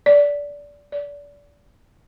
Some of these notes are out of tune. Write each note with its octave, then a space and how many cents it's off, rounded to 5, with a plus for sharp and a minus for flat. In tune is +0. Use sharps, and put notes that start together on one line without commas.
D5 -20
D5 -30